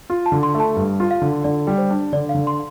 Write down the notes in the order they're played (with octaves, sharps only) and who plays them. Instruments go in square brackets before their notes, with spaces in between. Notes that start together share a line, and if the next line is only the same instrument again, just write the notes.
[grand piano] F4
[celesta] A5
[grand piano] D3
[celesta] C6
[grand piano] A3
[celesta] A5
[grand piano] G2
F4
[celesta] F5
[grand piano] D3
[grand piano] D3 [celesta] D5
[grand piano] G3
[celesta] C5
[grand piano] D4
[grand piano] D3 [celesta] D5
[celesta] F5
[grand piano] D3
[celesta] C6